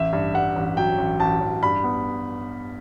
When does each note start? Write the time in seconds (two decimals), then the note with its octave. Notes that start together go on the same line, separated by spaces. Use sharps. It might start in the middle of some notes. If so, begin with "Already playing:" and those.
Already playing: A1 E5
0.13 G2
0.34 G2 F#5
0.56 A1
0.77 F#3 G5
0.98 A1
1.20 A1 A5
1.41 A1
1.63 G2 B5
1.84 B3